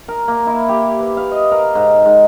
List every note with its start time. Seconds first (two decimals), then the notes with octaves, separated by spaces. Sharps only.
0.08 A#4
0.28 A#3
0.47 E4
0.69 G4
1.00 B4
1.17 F5
1.31 D#5
1.52 A#4
1.75 G#2
2.06 G#2